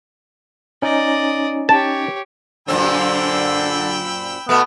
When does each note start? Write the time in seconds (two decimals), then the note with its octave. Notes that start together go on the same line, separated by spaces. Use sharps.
0.82 C#4 D#4 D5 D#5
1.69 G4 C#5 A5
2.68 F#2 A#2 D3 C4 G5 B5 E6
4.49 B2 A3 B3